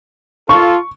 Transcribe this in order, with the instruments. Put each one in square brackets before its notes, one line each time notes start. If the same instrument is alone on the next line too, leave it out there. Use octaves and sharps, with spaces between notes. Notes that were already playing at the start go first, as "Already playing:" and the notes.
[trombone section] F4 A4 [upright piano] C#6